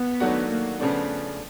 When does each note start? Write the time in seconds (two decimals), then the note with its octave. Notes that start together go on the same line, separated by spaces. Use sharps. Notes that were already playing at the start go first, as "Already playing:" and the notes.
Already playing: B3
0.20 D#3 F#3 A3 D4 F#4
0.50 A#3
0.80 C#3 F3 A3 B3 D4